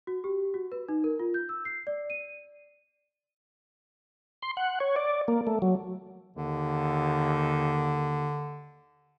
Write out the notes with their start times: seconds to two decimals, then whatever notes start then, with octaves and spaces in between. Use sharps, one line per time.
0.07 F#4
0.24 G4
0.54 F#4
0.72 B4
0.89 D#4
1.04 A#4
1.19 F4
1.34 G6
1.49 E6
1.65 C7
1.87 D5
2.10 D#7
4.42 C6
4.57 F#5
4.80 C#5
4.96 D5
5.28 A#3
5.47 A3
5.62 F#3
6.36 D#2 D3